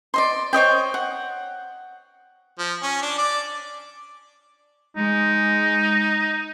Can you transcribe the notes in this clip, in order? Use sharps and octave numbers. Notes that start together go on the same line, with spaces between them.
D5 D#5 C6
C5 C#5 D#5 G5
F#5
F3
C#4
D4
D5
G#3 D#4